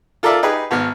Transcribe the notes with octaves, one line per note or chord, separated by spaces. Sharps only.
F4 A4 A#4 D5 E5 F5
D#4 G4 G#4 B4
G#1 B3 F6